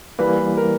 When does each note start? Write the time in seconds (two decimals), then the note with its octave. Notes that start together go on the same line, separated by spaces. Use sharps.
0.19 E3 G3 A#3 B4
0.57 A#4